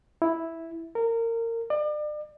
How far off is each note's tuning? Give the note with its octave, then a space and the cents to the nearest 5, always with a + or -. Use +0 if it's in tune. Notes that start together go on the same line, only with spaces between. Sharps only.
E4 -5
A#4 -25
D5 +35